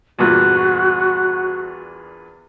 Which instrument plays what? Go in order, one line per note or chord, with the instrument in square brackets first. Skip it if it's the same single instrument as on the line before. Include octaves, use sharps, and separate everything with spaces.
[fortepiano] E2 G2 A#2 [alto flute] F#4